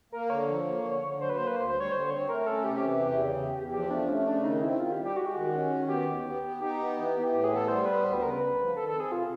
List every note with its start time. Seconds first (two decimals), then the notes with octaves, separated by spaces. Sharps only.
0.12 A#3 A#4
0.30 D3 C#5
0.48 F3
0.66 A#3
0.85 D3
1.02 D3
1.20 F#3 C5
1.30 B4
1.38 A#3 C5
1.47 B4
1.56 D2 C5
1.68 C5
1.74 G3
1.80 C#5
1.92 D3 C5
2.10 C4 C#5
2.28 A3 A#4
2.46 C#4 A4
2.64 C3 G4
2.76 G4
2.83 E3
3.00 E2 G4
3.19 C#3
3.37 E2
3.55 E2
3.72 F3 G4
3.90 A3 D4
4.08 A3 C#4
4.26 C#3 D4
4.44 D#3 D#4
4.62 C4 E4
4.80 D#3 F4
4.92 G4
4.99 G3
5.04 G4
5.16 G#3 F#4
5.25 G4
5.34 D#3 F#4
5.52 C#4
5.71 D#3
5.88 B3 G4
6.06 D#2
6.25 B3
6.43 B3
6.60 D#4 G4
6.79 B3
6.97 E3
7.14 E3
7.32 A2 G4
7.44 G#4
7.50 B3
7.56 A4
7.68 G3 C5
7.86 B3 B4
8.04 D2 C5
8.13 B4
8.22 C#3 A#4
8.31 B4
8.41 D2
8.58 F3
8.76 D#3 A4
8.88 A4
8.95 C4
9.00 G#4
9.12 C3 F4